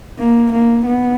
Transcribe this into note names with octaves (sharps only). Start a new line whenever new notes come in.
A#3
A#3
B3